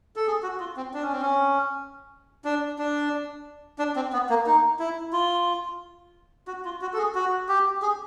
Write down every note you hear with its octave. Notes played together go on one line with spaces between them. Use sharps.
A4
G#4
F#4
F4
C4
D4
C#4
C4
C#4
D4
D4
D4
C4
B3
A#3
D#4
E4
F4
F#4
F4
F#4
A4
G#4
F#4
G4
G#4